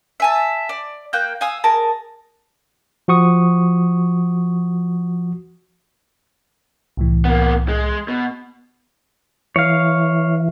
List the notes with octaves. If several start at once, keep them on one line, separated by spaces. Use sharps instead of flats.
E5 G#5 A5
D5
A#3 G5 F#6 G6
F5 G#5 D#6 E6
G#4 A#4 A5
F3 F#4 C#6 D#6
C2 A2 E3
A#3 B3
G#3
B2
E3 C#5 F5